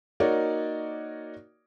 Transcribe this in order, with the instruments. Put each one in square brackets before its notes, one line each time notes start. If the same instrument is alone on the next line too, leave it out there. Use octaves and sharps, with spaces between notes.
[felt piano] A#3 D#4 F#4 A#4 C#5 D5